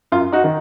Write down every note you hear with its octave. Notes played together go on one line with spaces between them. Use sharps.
F#2 F4
D#4 F#4
D#3